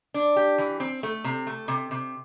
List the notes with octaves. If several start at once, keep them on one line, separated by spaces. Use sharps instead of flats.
D4
G4
E3
C4
A3
C3
A3
C3
C3